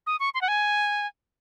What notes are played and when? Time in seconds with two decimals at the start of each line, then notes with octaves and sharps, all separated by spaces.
0.07 D#6
0.20 C#6
0.34 C6
0.41 F#5
0.48 G#5